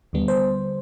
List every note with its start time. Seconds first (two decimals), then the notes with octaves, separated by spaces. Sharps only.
0.13 D#2 D3 G3 B3
0.28 C5